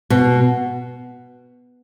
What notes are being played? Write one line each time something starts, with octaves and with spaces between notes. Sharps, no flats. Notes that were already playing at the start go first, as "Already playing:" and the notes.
B2